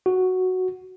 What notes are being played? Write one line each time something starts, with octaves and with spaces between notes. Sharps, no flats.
F#4